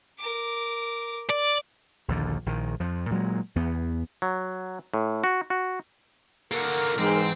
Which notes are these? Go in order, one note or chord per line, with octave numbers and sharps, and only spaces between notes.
A#4 D6
D5
A#1 D#2 D3
A#1 D#3
F2 F3
A#2 F#3 G#3
E2 B3
F#3
A2
F#4
F#4
A#3 F#4 A4 A#4 F#5
G#2 E3 C4